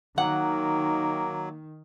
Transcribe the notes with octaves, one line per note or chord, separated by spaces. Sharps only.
D#3 F#3 A#3 F#5